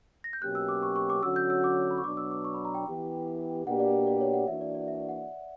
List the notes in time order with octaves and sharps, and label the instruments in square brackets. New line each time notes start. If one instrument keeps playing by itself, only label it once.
[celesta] A#6
G6
[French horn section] B2 F#3 A#3 C#4 G4 [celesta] F#6
[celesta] E6
D6
C#6
C#6
D6
[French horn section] D3 F#3 C#4 F#4 [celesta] E6
[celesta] G6
E6
D6
B5
C#6
[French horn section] B2 F#3 B3 D4 [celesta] D6
[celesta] E6
D6
C#6
B5
A#5
G5
[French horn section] E3 B3 E4 G4
[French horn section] B2 A#3 D4 G4 [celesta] F#5
[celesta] D5
D5
C#5
F#5
[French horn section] E3 A#3 D4 F#4 [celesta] E5
[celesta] D5
D5
E5
F#5